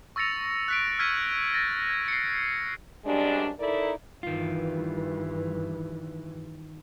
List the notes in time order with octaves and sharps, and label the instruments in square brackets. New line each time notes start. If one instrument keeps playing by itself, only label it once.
[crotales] C#6 E6 A6 A#6 C#7 F7
F#6 B6 D7
E6 F6 G#6 B6 D#7
A6 A#6
G#6
C7 C#7
[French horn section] F#2 C3 G3 G#3 D4
D#4 E4 A4 A#4 D5
[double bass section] G2 E3 [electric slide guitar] D#3 F4